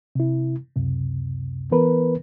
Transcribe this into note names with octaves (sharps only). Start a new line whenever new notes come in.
C3 E4
C#2 F#2 C3
E3 B3 A#4 B4